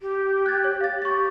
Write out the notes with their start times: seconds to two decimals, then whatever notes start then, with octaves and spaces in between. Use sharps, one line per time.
0.01 G4
0.46 F#6 G#6 A6
0.64 C#5
0.81 F5 A6
1.02 G4 C#6 A6